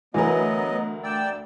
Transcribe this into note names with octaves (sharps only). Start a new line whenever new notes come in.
D2 E3 F#3 B3 A#4 D#5
D5 G5 E6